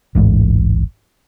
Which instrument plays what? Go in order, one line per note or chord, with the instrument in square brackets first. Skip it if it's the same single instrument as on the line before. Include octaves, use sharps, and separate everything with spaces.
[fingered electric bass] D1 A1 G#2